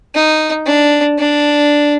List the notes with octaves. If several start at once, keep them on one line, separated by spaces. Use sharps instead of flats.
D#4
D4
D4